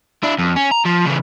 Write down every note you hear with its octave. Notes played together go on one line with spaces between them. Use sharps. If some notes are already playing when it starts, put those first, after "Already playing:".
D4 E4
F2
C#4
A#5
F3
C#3 E3